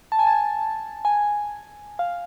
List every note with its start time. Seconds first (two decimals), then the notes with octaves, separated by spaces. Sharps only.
0.12 A5
0.19 G#5
0.27 A5
1.05 G#5
1.99 F5